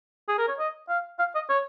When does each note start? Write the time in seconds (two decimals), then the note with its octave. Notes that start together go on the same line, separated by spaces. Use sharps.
0.28 G#4
0.38 A#4
0.48 C#5
0.59 D#5
0.89 F5
1.19 F5
1.35 D#5
1.49 C#5